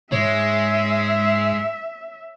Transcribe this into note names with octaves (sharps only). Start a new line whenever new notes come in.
G#2 G#3 C#5 E5